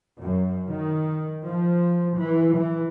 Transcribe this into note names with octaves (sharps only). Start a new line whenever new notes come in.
F#2
D#3
F3
E3
E3